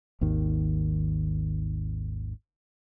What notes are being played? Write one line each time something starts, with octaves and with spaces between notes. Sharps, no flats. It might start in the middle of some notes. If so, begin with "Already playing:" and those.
G#1 D#2 D#3